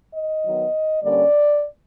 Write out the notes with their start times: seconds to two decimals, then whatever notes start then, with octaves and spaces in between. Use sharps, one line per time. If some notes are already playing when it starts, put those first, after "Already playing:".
0.15 D#5
0.45 D#3 F#3 B3
1.03 D3 G3 A#3 C#4 D5